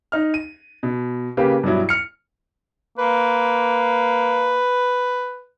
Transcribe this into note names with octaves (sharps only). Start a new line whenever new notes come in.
D#4 F6
D#7
B2
C#3 A#3 G4 B4
G2 B2 F#3 E4
F6 C#7
A#3 B4